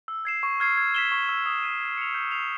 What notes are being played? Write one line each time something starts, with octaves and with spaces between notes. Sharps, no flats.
E6
G#6 C7 E7
C#6
F6 G#6 C7
G#6
B6 E7 G7
C#6
E6 G#6
D#6
G#6 B6 D#7
G#6
C#7 F7
G6
C7 F7